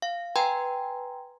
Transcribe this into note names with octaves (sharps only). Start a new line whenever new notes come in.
F5
B4 G5 G#5 A#5 C6 G#6